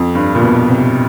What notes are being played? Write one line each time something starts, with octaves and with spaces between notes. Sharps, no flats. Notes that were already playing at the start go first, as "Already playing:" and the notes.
Already playing: F2
G2
A#2
B2
C3